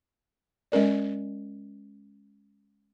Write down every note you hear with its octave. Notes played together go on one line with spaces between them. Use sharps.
G#3 C#4 A#4 D5